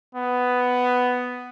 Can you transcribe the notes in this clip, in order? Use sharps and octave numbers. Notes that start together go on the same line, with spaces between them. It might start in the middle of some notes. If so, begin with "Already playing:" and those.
B3